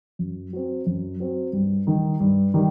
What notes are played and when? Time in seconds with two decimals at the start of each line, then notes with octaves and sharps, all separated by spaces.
0.19 F#2
0.53 F#3 C4
0.86 F#2
1.20 F#3 C4
1.53 G2
1.87 D#3 G3 D#4
2.20 G2
2.54 D#3 G3